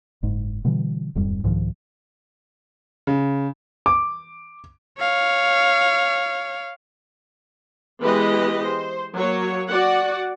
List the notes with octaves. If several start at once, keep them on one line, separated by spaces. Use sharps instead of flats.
F#1 G#2
B2 D3 E3 G3
D#1 F2 G#2 G3
C2 G#2 D#3 F3
C#3
D6
C#5 F5
E3 G#3 B3 G4 B4 D#5
C5
F#3 A#3 C#5
F#4 D5 F#5